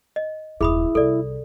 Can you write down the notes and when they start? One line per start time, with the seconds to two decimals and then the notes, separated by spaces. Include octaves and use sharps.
0.16 D#5
0.61 D#1 F#2 E4 G#4 B5 D#6
0.95 C2 A4 D5